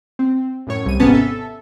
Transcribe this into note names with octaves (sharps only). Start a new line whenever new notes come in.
C4
F#2 A2 C#5
C2 D#7
G#1 G#2 C3 B3 C#4 A5
A4 E5